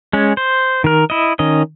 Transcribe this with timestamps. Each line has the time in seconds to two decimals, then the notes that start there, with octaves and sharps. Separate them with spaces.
0.13 G#3 C#4
0.37 C5
0.84 D#3 A#4
1.10 E4 D#5
1.39 D#3 C#4 D#5